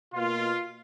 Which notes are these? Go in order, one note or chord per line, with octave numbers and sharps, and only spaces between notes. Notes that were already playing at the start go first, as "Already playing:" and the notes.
B2 A#3 F4